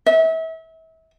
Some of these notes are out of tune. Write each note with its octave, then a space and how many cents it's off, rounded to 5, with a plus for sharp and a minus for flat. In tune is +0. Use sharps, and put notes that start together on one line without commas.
E5 -35